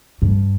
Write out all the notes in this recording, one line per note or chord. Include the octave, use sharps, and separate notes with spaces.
G2